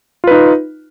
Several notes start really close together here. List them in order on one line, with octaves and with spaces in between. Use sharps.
F4 B4 D#4